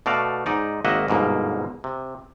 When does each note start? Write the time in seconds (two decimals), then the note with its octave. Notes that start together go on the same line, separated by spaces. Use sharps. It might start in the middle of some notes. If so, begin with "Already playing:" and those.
0.06 B2 A3 F#4 D5 F5
0.46 G#2 D#4 D5
0.85 G#1 A#3 F#4 D#5 E5 F#5
1.08 G1 G#2 B2 A#3
1.84 C3